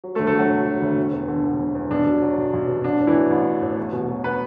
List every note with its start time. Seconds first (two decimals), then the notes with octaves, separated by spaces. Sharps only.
0.04 F#3
0.15 A3 A4
0.19 D2
0.27 A3 A4
0.35 D3 F#3 F#4
0.51 E1
0.66 F#3
0.82 D2
0.97 E1
1.13 E2
1.28 D3
1.44 E1
1.60 E1
1.75 E2
1.91 B1 D4
2.06 B2
2.22 F#3
2.38 B1
2.53 B1
2.68 B2
2.84 A1 D4
3.00 A2
3.07 E3 E4
3.15 F#3
3.31 A1
3.47 A1
3.62 A2
3.77 E2
3.93 B2
4.09 F#3
4.24 B3 B4